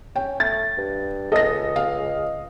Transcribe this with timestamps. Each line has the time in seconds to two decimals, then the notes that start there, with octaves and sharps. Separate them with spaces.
0.16 C#4 G5
0.40 A3 A6
0.78 G2
1.32 C#2 A4 D#5 A#6
1.76 F5